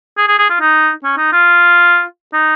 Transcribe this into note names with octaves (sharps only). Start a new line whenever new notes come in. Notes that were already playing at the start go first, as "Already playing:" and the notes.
G#4
G#4
G#4
F4
D#4
C#4
D#4
F4
D#4